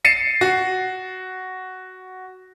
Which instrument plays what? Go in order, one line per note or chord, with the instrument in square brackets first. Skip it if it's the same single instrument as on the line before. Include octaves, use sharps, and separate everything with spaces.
[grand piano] A6 C7 C#7 D#7 E7
F#4